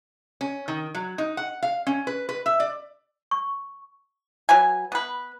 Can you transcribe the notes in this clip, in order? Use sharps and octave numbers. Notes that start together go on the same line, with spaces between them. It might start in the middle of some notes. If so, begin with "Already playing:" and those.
C#4
D#3
F#3
D#4
F#5
F5
C#4
B4
B4
E5
D5
C#6
F#3 B4 G#5
B3 B4